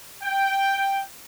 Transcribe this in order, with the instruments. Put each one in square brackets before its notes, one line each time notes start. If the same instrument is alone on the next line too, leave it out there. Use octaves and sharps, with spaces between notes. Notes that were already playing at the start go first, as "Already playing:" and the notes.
[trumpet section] G5